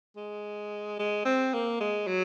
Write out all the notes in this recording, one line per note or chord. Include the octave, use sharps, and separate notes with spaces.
G#3
G#3
C4
A#3
G#3
F#3